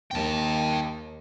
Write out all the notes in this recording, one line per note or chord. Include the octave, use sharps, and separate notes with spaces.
D#2 G5 A5